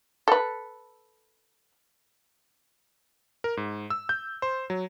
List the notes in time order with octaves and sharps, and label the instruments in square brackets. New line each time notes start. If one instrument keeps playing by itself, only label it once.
[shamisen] A4 B4
[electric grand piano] A#4
G#2
E6
G6
C5
F#3